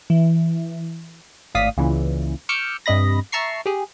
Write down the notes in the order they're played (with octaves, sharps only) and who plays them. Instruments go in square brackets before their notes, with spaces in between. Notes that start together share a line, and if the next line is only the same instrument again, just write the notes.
[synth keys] E3
G#1 A2 D5 F5 D#6 B6
C#2 A#2 C#3 E3
C#6 D6 E6 F6 G6 C#7
G2 C3 D#5 B5 A#6
E5 A5 A#5 C#6 C7
G4 G#4